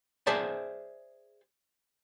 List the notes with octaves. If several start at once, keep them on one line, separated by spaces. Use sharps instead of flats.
G#4 C5 D5 E5 A5